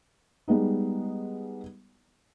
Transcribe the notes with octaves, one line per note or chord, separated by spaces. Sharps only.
G3 G#3 B3 D#4